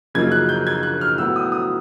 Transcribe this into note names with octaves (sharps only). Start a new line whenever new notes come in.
F#2 C#3 F3 A#3 D#4 G#6
F#6
G6
G#6
F#6
F6
A2 F#3 B3 E6
D#6
D#6